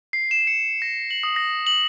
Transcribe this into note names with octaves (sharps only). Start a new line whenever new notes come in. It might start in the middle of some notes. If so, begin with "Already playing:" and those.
C7
E7
C#7
A#6
F#7
D#6
A#6
F#7